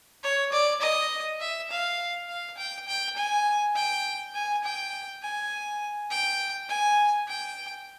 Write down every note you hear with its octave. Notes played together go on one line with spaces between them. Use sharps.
C#5
D5
D#5
E5
F5
F5
G5
G5
G#5
G5
G#5
G5
G#5
G5
G#5
G5